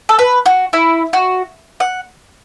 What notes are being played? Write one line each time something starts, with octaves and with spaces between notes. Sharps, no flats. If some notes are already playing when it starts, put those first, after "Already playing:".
A4
B4
F#4
E4
F#4
F#5